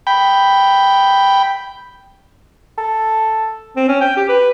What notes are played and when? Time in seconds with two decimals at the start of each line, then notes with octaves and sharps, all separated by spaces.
0.07 G5 B5
2.78 A4
3.77 C4
3.89 C#4
4.01 G5
4.17 G4
4.29 B4